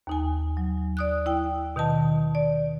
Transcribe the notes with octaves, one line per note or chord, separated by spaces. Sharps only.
D#2 D#4 G#5
F#3
D5 D#6 F#6
E4 G5
B2 D#3 D#5 A5
D5